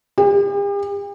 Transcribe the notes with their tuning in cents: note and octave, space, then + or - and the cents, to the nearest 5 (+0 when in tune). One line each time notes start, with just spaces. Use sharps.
G4 +45